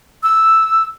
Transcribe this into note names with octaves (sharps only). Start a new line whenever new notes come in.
E6